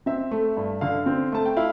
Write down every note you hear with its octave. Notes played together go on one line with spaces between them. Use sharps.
C4 E5
A3
G2
D3 F5
C4
A3 A5
G5
E4 F5